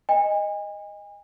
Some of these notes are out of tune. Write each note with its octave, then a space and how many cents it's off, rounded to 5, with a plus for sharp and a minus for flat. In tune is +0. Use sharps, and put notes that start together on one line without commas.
D#5 +0 G#5 -40